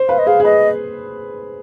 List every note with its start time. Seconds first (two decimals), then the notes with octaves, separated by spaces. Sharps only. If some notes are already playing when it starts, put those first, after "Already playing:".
Already playing: C5
0.09 B4 F5
0.18 D#5
0.27 G#4 F5
0.40 G#4
0.44 B4 D#5